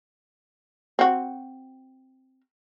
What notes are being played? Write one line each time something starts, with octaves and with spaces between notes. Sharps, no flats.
C4 F#4